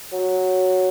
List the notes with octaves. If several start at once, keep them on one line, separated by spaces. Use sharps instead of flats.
F#3